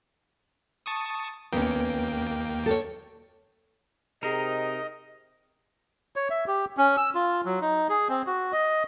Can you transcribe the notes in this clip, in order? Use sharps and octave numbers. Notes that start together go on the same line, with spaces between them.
A5 C#6 D#6
D#2 A#3 B3 C#4 G5
A4 C#5
C3 D#4 G#4 A#4 D#5
C#5
E5
G4
C#4
E6
F4
F#3
D#4
G#4
C4
F#4
D#5